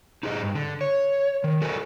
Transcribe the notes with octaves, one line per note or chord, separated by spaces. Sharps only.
D#4 G4 G#4 C#5 D#5
G2
D3
C#5
D#3
F#4 A4 A#4 C5 D#5 G#5